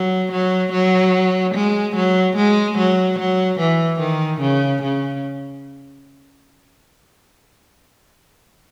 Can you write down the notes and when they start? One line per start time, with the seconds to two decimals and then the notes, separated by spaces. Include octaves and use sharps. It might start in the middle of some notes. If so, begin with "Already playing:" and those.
Already playing: F#3
0.32 F#3
0.72 F#3
1.55 G#3
1.96 F#3
2.36 G#3
2.78 F#3
3.19 F#3
3.60 E3
4.00 D#3
4.41 C#3
4.82 C#3